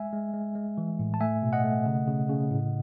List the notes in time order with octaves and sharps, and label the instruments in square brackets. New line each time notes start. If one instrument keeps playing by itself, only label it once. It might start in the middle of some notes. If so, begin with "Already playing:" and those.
Already playing: [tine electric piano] G#3 E5 G#5
G#3
G#3
G#3
E3
A2
A5
A3 E5 G#5
B2
D#5 F#5
A3
C#3
C#3
C#3
A2